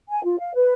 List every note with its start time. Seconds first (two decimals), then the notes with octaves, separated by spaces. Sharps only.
0.09 G#5
0.24 F4
0.39 F5
0.54 B4